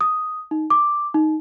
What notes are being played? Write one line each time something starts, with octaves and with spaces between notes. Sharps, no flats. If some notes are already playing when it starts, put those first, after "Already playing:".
D#6
D#4
D6
D#4